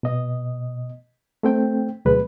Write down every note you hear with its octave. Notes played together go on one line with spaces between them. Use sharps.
B2 D#5
A3 C4 G5
D2 B2 F#3 G#3 B4